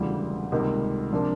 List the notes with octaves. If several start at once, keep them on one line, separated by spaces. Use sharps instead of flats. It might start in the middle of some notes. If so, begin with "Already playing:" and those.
Already playing: E1 D2 C#3 E3 G3
C#2 C3 D#3 G3 A#3
C3 F3 A#3 D4